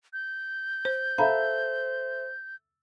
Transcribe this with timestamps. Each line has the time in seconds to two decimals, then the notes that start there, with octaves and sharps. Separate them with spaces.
0.13 G6
0.85 C5
1.18 A4 C5 E5 F5 A#5 B5